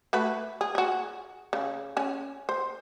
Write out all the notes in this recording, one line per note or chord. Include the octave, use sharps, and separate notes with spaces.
A3 F#4 B4
G#4
F#4 G#4
C#3
C#4 G#5
C5